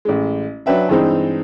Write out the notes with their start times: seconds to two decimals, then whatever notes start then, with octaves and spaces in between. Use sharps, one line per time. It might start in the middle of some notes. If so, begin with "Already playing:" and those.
0.05 A1 G#3
0.66 F#3 D4 B4 E5 G5
0.89 G2 E3 G#3 C4 D#4